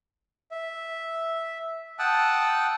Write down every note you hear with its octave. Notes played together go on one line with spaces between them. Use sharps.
E5
F#5 G5 A5 D#6 E6 F#6